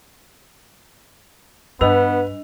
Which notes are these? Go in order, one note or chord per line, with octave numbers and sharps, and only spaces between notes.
G2 B3 D4 B4 D#5 E6 F7